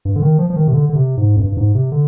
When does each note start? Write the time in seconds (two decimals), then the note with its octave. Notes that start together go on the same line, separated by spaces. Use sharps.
0.05 G2
0.16 D3
0.22 D#3
0.39 F3
0.50 F3
0.56 D#3
0.68 C3
0.73 D3
0.89 D3
0.95 C3
1.17 G#2
1.36 F2
1.40 G2
1.52 G2
1.57 G#2
1.75 C3
1.92 D3